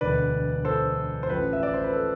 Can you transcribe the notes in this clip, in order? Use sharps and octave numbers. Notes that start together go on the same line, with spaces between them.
E1 D2 D3 B4 D5
A4 C5
C5
A1 A2 F3 B4
E5
D5
C5
B4
A4